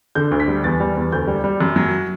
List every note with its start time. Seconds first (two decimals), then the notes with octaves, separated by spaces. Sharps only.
0.15 D3 G6
0.31 D2
0.40 B6
0.48 G3
0.64 E2 A6
0.80 G3
0.96 E2
1.12 D2 G6
1.27 G3
1.44 G3
1.61 F#2
1.76 F#3